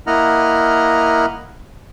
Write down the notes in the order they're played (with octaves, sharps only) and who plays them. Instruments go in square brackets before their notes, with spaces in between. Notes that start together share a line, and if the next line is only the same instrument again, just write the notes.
[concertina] A#3 E4 D#5 F#5 A#5 F6